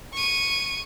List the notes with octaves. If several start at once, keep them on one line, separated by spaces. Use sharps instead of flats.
C#6 D#7